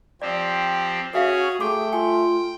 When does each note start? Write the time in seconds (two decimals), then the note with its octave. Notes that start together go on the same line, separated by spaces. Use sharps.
0.22 F3 C4 G4 D5
1.14 C#4 F#4 G#4 A4 E5 F5
1.61 A3 F#4 G#4 G5 D6
1.93 F4 G#5